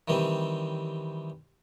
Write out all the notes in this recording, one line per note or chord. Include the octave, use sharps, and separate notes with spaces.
D#3 E3 G3 C4